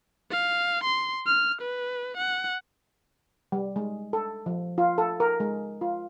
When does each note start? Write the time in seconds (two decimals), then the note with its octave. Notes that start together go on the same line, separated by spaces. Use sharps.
0.31 F5
0.84 C6
1.27 F6
1.61 B4
2.17 F#5
3.52 G3
3.76 G#3
4.13 A4
4.46 F3
4.78 F4
4.98 A4
5.20 A#4
5.40 G#3
5.81 F4